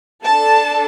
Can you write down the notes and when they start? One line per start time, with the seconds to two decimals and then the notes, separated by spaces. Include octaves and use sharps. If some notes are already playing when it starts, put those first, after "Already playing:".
0.25 D4 A4 A5